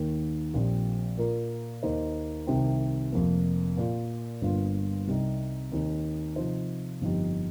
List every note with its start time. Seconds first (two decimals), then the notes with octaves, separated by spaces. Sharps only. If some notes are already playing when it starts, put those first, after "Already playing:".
Already playing: D#2 D#3 A#3
0.54 A#1 A#2 F3 C4 G4
1.17 A#2 A#3 F4 A#4
1.83 D#2 D#3 A#3 D#4 C5
2.47 C2 C3 D#3 C4
3.12 F1 F2 F3 A#3
3.77 A#2 A#3 F4
4.41 G1 G2 G3 A#3 F4
5.07 C2 C3 G3 D#4
5.72 D#2 D#3 C4 D#4
6.36 C3 F3 D#4 C5
7.01 G1 F2 F3 D#4 G4